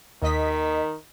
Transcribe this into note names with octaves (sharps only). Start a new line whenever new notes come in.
D#2 D#3 D#5 B6